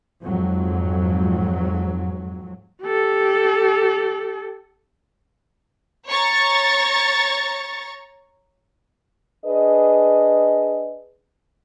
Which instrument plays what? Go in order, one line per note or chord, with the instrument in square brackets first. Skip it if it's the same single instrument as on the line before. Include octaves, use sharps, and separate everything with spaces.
[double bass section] F2 G#2 F#3
[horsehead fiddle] G4 A4
[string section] C#5 A#5 C#6 A6
[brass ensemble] D4 G#4 B4 D#5